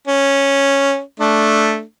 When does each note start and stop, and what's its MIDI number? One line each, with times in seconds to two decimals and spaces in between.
0.07 1.00 61
1.20 1.82 57
1.20 1.82 62